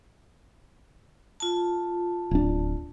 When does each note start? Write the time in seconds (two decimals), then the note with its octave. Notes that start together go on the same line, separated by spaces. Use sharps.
1.40 F4 A5
2.31 D1 D4